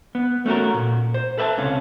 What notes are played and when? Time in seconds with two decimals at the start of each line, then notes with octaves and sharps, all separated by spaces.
0.15 B3
0.46 A3 C#4 F#4 A#4
0.74 A#2
1.14 C5
1.38 A4 B4 E5 G5 A5
1.58 C#2 C3 C#4 F5